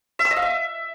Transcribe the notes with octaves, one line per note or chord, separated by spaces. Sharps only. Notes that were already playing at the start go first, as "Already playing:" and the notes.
E5
E6
D#5
F5
E5